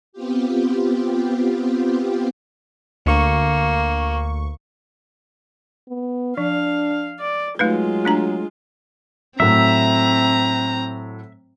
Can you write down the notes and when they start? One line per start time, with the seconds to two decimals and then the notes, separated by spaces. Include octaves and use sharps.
0.13 B3 C4 F4 G4
3.06 D2 A#3 C#6
5.88 B3
6.37 F3 D4 F5
7.19 D5
7.59 F#3 G#3 A3 D#4 F4 B4
8.05 A3 D4 A#5
9.40 A2 F#3 C4 E5 A#5